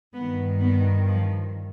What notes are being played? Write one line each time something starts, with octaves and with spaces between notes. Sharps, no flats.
G2 D#3 B3
B3
F3